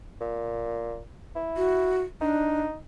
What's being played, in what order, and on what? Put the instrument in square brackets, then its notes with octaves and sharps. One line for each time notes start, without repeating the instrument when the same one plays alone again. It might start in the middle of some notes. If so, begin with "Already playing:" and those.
[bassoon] A#2
E4
[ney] F#4
[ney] D4 [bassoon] D#4